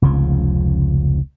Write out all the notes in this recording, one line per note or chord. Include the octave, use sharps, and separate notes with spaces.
F1 C#2 C#3 F3